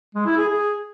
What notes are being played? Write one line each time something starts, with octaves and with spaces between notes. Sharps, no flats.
G#3
E4
G#4
G#4